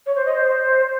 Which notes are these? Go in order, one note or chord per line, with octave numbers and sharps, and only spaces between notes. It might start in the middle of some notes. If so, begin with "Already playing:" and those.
C#5
C5
D#5
C5